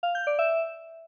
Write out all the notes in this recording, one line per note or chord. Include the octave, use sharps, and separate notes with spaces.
F5
G6
D5
E5